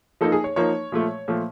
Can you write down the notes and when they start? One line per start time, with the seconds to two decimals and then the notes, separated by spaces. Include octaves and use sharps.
0.21 F3 A#3 D#4 A4
0.32 G#4
0.44 C#5
0.56 F3 A#3 D#4 C#5
0.92 A#2 F3 A3
1.28 A#2 F3 A3